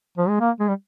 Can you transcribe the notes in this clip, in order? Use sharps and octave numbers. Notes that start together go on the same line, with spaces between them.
F3
G#3
A#3
G#3
G3